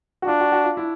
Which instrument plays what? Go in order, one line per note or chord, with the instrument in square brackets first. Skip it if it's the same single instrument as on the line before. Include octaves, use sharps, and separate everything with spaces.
[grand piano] F#4
[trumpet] D4 [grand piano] F4
[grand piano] F#4
F#4
F4
E4